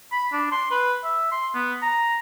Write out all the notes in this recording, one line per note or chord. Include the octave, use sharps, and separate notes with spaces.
B5
D4
C6
B4
E5
C6
B3
A#5